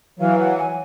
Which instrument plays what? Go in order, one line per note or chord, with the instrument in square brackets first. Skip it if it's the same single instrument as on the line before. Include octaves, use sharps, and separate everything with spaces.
[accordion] E3 F#3 [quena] F5
[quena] F#5
G#5